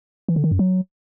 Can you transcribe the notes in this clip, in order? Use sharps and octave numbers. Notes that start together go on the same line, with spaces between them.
E3
D3
D#3
F#2
F#3